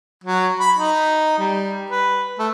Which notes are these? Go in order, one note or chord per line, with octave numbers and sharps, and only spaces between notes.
F#3
B5
D#4
G3
B4
A3